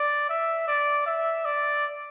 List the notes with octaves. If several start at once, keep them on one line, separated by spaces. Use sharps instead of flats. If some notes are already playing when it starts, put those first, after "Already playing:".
Already playing: D5
E5
D5
E5
D5